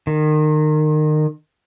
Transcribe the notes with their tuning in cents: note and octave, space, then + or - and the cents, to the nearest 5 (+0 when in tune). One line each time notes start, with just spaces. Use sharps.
D#3 -30